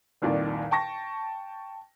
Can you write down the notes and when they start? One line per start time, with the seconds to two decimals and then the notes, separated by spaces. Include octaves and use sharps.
0.22 F1 C2 A#2 D#3 D5
0.71 G5 A5 C#6 A#6